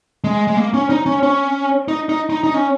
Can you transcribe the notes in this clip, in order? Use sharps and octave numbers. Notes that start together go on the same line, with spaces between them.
G#3
G#3
A#3
C#4
D#4
C#4
C#4
D#4
D#4
D#4
D#4
C#4